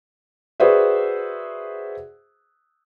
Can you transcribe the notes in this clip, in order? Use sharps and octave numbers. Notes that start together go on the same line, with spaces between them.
F#4 G#4 B4 C5 D5 E5